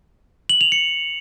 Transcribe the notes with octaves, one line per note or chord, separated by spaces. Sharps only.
F#7
F7
C#7